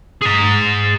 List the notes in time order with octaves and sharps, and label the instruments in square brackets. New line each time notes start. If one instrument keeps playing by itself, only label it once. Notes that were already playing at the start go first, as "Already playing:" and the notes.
[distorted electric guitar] G#4 A#5